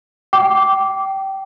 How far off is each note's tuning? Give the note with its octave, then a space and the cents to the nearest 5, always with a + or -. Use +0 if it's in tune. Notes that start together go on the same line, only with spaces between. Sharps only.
G5 -20 D6 -10